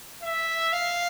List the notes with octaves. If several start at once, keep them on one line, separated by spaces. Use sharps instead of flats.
E5
F5